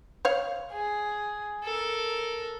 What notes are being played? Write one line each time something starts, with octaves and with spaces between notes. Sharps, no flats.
C5 C#5 F5
G#4
A4 A#4